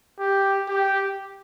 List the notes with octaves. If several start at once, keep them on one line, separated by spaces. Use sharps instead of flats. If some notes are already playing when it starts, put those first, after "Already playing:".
G4
G4